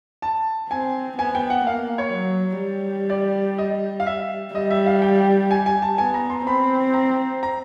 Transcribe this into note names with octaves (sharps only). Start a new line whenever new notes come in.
A5
C4 G#5
B3 G#5
G5
F#5
A#3 F5
C#5
F#3
G3
D5
D#5
F5
E5
G3 D#5
E5
F5
G5
G#5
G#5
A5
B3 G#5
A#5
C6
C4 B5
A#5
A#5